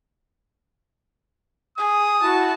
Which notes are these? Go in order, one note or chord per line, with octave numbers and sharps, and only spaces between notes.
G#4 D#6
E4 F#4 A5